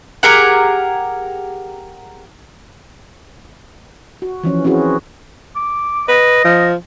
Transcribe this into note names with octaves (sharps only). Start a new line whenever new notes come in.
G4 G#4 A#4 F#5
F#4
E3 F3 C#4
C4 C#4 E4 F#4 G#4
D6
B4 D#5
F3